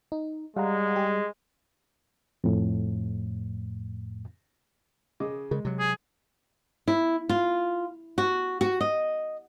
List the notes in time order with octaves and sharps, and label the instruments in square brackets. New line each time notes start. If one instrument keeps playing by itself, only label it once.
[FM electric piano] D#4
[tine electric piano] G3 [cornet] G#3 [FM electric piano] F5 F#5 A#5
[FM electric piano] G4 G#4
[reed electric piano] F2 A2
[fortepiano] C#3 D#5 D6
[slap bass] C#3 [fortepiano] G#3
[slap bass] C3 F#3
[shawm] G#4
[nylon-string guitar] E4
F4
F#4
F#4
D#5